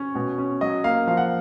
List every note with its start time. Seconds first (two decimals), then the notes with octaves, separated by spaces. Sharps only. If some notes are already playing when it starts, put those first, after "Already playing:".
Already playing: C#4 C#5
0.15 B2
0.38 C#4
0.61 F#3 D#5
0.84 A#3 F5
1.07 F3 F5
1.17 F#5
1.26 F5